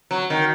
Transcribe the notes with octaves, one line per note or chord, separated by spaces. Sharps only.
F#3
D#3